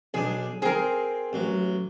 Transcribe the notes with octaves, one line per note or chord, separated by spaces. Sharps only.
B1 D4 G#4
C4 G#4 A#4
A1 F#3